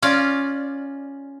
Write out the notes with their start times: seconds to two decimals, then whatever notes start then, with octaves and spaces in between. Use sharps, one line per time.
0.02 C#4 F4 D5